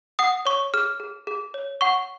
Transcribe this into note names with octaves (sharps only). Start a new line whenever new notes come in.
F#5 D#6
C#5 C#6
G#4 F6
G#4
G#4
C#5
F#5 C#6